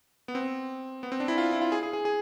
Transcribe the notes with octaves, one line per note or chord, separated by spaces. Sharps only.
B3
C4
B3
C4
D4
E4
F4
E4
F4
G#4
G#4
G#4
G#4